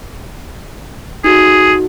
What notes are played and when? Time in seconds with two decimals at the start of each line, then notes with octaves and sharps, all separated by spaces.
1.24 D#4 F#4 G#4 A4